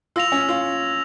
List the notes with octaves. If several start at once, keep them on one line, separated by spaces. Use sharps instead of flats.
F4 E6 A#6 F7
C#4
F4